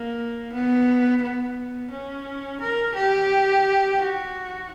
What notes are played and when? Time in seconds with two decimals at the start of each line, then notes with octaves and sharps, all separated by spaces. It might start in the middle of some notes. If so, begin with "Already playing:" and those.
Already playing: A#3
0.53 B3
1.22 B3
1.91 C#4
2.61 A#4
2.95 G4
3.98 F#4